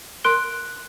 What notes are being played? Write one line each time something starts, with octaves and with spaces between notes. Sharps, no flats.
A#4 C6 F#6 D7 G7